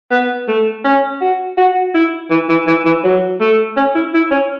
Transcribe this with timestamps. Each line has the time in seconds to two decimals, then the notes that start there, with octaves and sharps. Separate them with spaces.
0.11 B3
0.48 A3
0.84 C#4
1.21 F#4
1.57 F#4
1.94 E4
2.30 E3
2.49 E3
2.67 E3
2.85 E3
3.04 F#3
3.40 A3
3.76 C#4
3.95 E4
4.14 E4
4.31 C#4